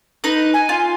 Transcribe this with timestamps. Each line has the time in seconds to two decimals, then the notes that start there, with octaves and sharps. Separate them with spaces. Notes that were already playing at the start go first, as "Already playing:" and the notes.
0.24 D#4 B4
0.54 G#5
0.69 F4